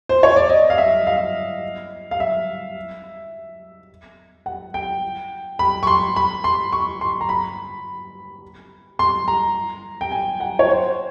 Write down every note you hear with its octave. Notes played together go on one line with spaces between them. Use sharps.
C5
C#5
D5
D#5
F5
E5
F5
F5
E5
F#5
G5
B5
C#6
C6
B5
C6
C#6
C6
A#5
B5
C6
A#5
G5
G#5
F#5
C#5
C5